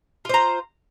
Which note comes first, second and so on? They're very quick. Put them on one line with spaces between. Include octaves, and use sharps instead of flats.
F4 C5 A#5